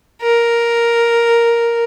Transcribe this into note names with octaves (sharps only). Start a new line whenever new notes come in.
A#4